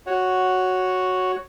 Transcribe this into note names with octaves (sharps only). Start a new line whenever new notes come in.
F#4 C#5 F#5